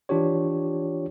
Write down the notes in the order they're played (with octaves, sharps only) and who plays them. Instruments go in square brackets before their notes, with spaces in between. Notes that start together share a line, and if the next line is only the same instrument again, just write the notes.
[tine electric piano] E3 D4 F4 G4 C#5